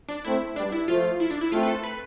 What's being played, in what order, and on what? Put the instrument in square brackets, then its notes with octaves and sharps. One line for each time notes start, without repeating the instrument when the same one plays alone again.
[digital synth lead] D4
[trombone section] A3 C4 [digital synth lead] E4
[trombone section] G3 B3 [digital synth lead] D4
[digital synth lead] E4
[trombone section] F3 A3 [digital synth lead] F4
[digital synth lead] E4
D4
E4
[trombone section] A3 C4 [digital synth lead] F4
[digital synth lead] B4
A4
B4